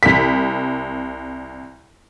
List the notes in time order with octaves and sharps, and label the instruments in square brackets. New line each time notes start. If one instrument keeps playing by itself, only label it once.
[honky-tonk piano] C2 B6